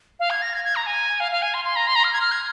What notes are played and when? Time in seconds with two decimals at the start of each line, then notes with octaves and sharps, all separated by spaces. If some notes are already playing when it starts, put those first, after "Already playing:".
0.20 F5
0.30 G#6
0.42 A#6
0.53 G#6
0.64 G#6
0.76 A#5
0.86 G#5
1.20 F5
1.32 F5
1.42 G#5
1.54 C6
1.65 C6
1.76 A#5
1.87 C6
1.95 A#5
2.04 F6
2.13 G#6
2.21 F6
2.32 G#6